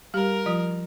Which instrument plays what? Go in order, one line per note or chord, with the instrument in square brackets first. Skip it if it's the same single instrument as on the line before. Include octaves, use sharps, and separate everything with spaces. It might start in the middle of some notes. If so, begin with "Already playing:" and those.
[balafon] G3 G4 [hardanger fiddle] A#4
[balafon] F3 F4